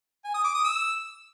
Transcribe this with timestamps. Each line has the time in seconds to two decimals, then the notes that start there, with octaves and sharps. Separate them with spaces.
0.24 G#5
0.34 D#6
0.44 D6
0.54 D#6
0.64 E6